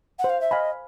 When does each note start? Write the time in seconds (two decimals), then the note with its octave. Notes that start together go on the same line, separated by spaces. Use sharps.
0.19 F#5
0.24 C5
0.29 F5
0.41 E5
0.51 D#5 F5 G#5 B5